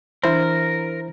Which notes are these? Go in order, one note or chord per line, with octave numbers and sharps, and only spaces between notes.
E3 D4 E4 A#4 C5